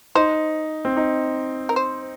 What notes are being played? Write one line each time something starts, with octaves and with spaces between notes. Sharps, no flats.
D#4 C5
C4
D#4
A#4
C5